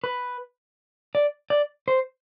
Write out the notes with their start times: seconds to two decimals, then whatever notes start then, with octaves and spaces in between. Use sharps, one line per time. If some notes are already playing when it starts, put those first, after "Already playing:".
0.04 B4
1.15 D5
1.50 D5
1.88 C5